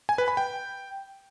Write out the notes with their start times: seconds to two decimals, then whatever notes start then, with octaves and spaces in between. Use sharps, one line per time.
0.09 G#5
0.18 B4
0.28 B5
0.37 G5